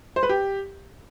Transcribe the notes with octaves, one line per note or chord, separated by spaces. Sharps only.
C5
B4
G4